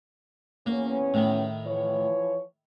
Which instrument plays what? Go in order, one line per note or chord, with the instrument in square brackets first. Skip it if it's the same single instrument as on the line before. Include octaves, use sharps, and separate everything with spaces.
[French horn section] E2 B3 C#4 [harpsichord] A#3
[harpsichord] A2 D#3
[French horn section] E3 F3 C#5